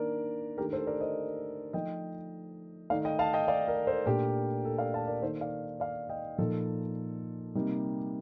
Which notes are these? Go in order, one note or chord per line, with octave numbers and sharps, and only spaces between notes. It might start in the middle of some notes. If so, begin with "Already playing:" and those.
Already playing: D#3 A#3 D4 A#4 D5
D#3 A3 D4 G4 A#4
A4 C5
A#4 D5
C5 D#5
F3 A3 D#4 D#5 G5
D#3 A3 D#4 D5 F5
D#5 G5
F5 A5
D#5 G5
D5 F5
A#4 D5
A4 C5
A#2 A3 D4 G4 A#4
A4
D5 F5
F5 A5
A#4 D5
D#3 A#3 D#4 A4 C5
D5 F5
D5 F5
D#5 G5
A#2 F3 A#3 D#4 A4
C3 G3 A#3 D#4